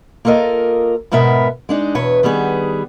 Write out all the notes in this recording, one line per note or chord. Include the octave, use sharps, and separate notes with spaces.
A#3 F4 A4 A#4 D#5
G#2 B2 B3 A#4 E5
G#3 D4 D#4
E2 B2 B4 C#5
D#3 G3 B3 G#4